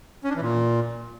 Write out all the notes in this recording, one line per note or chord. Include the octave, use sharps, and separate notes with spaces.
C#4
D4
E3
A#2